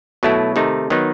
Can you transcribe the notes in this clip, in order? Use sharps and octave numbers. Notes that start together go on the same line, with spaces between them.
B2 F#3 A3 E4
C3 D#3 A3 D#4
D#3 F#3 B3 D#4